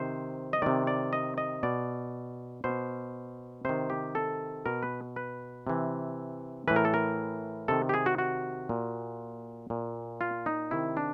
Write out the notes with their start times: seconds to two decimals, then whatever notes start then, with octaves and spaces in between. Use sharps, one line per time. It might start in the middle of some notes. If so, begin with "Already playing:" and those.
Already playing: C3 D#3 C5
0.53 D#5
0.62 C3 D#3 D5
0.87 D5
1.13 D#5
1.38 D#5
1.63 B2 D5
2.64 B2 C5
3.65 C3 D#3 C5
3.90 G4
4.15 A4
4.66 B2 A#4
4.83 B4
5.16 B4
5.67 C3 E3
6.68 A2 E3 B4
6.76 A#4
6.85 A4
6.94 A#4
7.68 C3 D#3 A4
7.89 G4
7.94 G#4
8.06 F#4
8.18 F#4
8.69 A#2
9.70 A#2
10.21 F4
10.46 D#4
10.71 C3 D#3 E4
10.97 D4